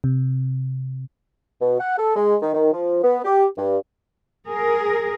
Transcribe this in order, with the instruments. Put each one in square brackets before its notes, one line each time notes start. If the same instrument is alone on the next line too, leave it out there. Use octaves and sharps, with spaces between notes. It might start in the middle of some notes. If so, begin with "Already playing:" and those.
[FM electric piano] C3
[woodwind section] B2
F#5
A4
G#3
D#3
D#3
F3
B3
G4
G2
[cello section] G#4 A#4